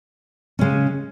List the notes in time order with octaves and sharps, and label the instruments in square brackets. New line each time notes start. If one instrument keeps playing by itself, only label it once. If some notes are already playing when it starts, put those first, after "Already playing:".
[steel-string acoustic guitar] C#3 G#3 C#4